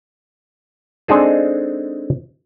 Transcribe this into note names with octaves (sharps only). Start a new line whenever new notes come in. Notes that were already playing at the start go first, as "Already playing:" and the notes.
G#3 C4 D4 D#4 G#4 A4